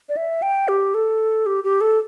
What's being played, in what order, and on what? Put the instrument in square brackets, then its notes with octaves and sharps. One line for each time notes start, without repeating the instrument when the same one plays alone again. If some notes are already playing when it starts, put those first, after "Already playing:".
[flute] D5
E5
G5
G4
A4
G4
G4
A4